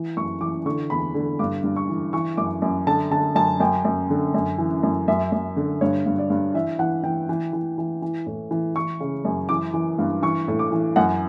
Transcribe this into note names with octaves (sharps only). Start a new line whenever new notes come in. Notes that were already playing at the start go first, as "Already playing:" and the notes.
Already playing: E3
F#2 C#6
E3 D6
D3 C#6
E2 B5
D3
G2 D6
G2
C#6
E3
E3 C#6
F#2 D6
F#2
D3 A5
D3 A5
F#2 A5
F#2 G5
F#2
D3
F#2
E3
F#2
F#2 E5
F#2
D3
G2 C#5
G2
D5
G2
E3 E5
E3 F#5
E3 G5
E3
E3
E3
E3
A2
E3
E3 C#6
C#3
F#2
E3 D6
E3
G2
E3 C#6
A2
D6
E3
F#2 F#5